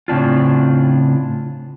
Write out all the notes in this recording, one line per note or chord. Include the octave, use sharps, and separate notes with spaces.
A2 C#3 C4 D4 F4